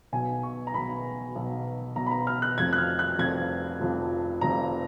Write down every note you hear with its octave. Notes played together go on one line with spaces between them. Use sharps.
B1 B2 G#5
C#6
A#5
B1 B2 B5
B1 B2
B1 B2 A#5
B5
A#5
F6
F#6
F1 F2 F3 G#6
F#6
F6
F#6
F1 F2 F3 G#6
F1 F2 F3
F1 F2 F3 A#5